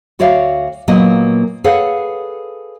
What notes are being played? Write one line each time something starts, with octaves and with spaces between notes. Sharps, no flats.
D2 F#4 C#5 D5 E5 F5
A#2 F#3 A#3 B3 D#5
G#4 A4 B4 C#5 F5 F#5